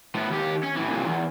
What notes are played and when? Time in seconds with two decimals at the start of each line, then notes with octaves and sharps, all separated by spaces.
0.15 A2 B3
0.30 D#2 G4
0.63 C#4
0.76 A2 E3
0.89 C2 A#2
1.06 E2